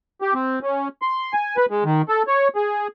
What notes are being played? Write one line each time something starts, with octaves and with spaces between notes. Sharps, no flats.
G4
C4
C#4
C6
G#5
B4
G#3
D#3
A4
C#5
G#4